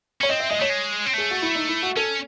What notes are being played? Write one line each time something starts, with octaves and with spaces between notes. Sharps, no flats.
C#4 C#5
C4 D#5
E5
G#3 D#5
A3 C#5
G#3
C4
A3 G#4
F#4
E4
D#4
E4
F#4
C#4 A4